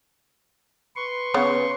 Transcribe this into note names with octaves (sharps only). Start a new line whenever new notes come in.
B4 C6 C#6
C#3 B3 C#5